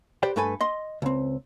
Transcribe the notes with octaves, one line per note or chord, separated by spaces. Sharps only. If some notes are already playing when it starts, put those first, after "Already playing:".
G4 B4 C5 D5 G5
G2 A3 A4 B4 G#5
D#5 C6
C#2 C4